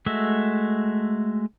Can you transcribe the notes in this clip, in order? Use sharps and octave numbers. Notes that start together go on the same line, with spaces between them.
G#3 A3 F#4 E5